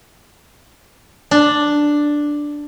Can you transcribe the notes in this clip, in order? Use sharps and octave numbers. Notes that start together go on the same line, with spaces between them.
D4